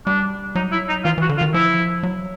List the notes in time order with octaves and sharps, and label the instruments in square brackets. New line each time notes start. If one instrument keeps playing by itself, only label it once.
[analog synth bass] G3 [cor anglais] D4
[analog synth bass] F#3 [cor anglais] D#4
[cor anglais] E4
D#4
[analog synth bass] E3 [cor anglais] F4
[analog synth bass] E3 [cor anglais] F#4
[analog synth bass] D3
[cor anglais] F4
[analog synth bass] D#3
[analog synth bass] F3 [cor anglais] E4
[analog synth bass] F#3